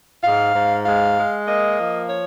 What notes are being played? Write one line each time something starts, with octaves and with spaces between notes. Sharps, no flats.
G#2 F5
G#2
G#3 F5
G#3
A#3 D#5
F3
C#5